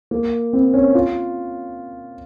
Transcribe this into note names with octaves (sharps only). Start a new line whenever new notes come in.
A#3
C4
C#4
F4